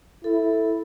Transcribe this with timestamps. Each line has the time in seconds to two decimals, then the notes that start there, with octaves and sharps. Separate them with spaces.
0.24 E4 A4